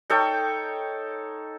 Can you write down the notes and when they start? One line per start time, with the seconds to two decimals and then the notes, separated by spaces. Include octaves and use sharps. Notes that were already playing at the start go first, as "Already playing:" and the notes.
0.10 D#4 A4 C#5 G5